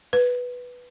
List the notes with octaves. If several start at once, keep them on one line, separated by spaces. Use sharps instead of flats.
B4